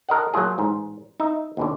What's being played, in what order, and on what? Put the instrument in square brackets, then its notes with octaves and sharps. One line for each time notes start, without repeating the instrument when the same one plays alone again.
[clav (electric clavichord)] A4 A#4 D#5 F#5
F#3 A3 A#3 F4 G#4
A1 G#2
D#4 E5
D#2 B2 D3